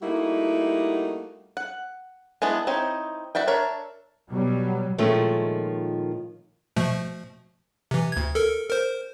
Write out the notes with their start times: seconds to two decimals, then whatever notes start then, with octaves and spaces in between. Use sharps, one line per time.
0.02 G3 A3 A#3 D#4 E4 F#4
1.57 F#5
2.42 G#3 B3 D4 E4
2.67 C4 D#4 E4 C#5
3.35 F#4 D5 E5 G5
3.48 D4 A#4 C#5 E5
4.30 B2 F#3 G3
4.98 A#2 D#3 F3 G#3 A3 C#4
6.76 B2 F3 A3
7.91 C3 E3
8.12 D2 G#6
8.35 A4 A#4
8.69 A#4 C5